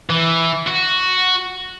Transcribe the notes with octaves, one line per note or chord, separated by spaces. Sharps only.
E3
F#4